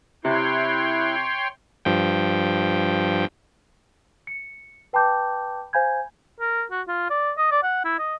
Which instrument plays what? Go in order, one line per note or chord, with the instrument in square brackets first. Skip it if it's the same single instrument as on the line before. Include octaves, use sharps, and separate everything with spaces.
[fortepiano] C3 [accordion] E4 F#6 [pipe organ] C#5 G5 C6
[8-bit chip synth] G2 F3 G5
[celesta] C#7
B4 G5 A5 B5 D6 G6
C5 F5 G#5 B5 G6 G#6
[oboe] A#4
F#4
F4
D5
D#5
D5
F#5
E4
D#5